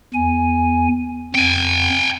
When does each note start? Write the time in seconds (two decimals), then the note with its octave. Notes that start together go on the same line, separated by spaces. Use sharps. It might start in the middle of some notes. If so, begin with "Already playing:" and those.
0.14 E2 G#5
1.35 F2 G5 G#5